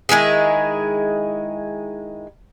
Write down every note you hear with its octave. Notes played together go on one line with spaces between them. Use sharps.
D#3 G#3 E4 G#4